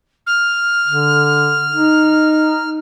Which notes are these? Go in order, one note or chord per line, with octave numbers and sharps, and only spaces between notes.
F6
D3
D#4